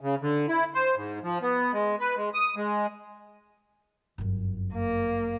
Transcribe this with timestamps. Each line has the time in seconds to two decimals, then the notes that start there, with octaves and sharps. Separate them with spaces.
0.01 C#3
0.22 D3
0.48 E4
0.75 C5
0.96 G#2
1.23 F3
1.42 B3
1.73 G#3
2.00 B4
2.17 G#3
2.34 D#6
2.56 G#3
4.18 G1 F#2
4.74 A#3